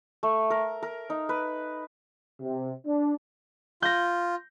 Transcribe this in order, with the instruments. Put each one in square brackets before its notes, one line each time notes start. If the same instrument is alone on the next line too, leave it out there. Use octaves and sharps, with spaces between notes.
[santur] A3
A#4
A#4
D#4
B4
[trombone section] C3
D4
[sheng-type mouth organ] F4 [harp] G6 A#6